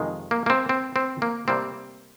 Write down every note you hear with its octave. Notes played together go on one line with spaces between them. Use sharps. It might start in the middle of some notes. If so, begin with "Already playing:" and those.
Already playing: F2 C3 D#3 G#3
A#3
A#3
C4
C4
C4
A#3
C3 G3 A#3 C4